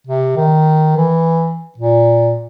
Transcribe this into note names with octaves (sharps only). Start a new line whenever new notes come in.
C3
D#3
E3
A#2